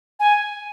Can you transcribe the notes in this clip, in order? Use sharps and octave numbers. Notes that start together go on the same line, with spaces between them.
G#5